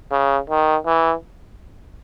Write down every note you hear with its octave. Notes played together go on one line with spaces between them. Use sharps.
C#3
D#3
E3